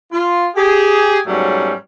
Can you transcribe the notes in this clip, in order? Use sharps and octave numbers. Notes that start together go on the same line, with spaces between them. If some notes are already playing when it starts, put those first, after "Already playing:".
F4
G4 G#4
G#2 B2 F#3 G3 A3 C#4